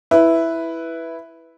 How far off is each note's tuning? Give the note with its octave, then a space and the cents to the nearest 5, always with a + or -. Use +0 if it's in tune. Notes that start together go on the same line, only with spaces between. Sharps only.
E4 +0 B4 +0